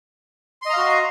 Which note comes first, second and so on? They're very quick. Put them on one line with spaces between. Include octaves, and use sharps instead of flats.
C6 D#5 A#5 F5 F#4